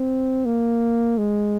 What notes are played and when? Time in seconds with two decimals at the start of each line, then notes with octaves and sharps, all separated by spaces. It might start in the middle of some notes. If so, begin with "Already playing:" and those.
Already playing: C4
0.45 A#3
1.18 G#3